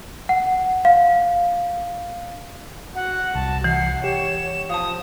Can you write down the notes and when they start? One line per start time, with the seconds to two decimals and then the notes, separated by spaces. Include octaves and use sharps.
0.29 F#5
0.85 F5
2.95 F#4 F#5
3.35 C2 A5
3.64 E3 F#5 C7
4.04 G4 C#5 E7
4.70 F3 F5 A5 D#6